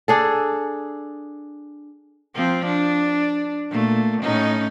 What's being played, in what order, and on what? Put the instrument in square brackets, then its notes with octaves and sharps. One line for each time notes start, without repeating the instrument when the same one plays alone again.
[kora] D4 G#4 A4
[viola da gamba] F3 C4
D4
A#2 A3
A2 C#4 D#4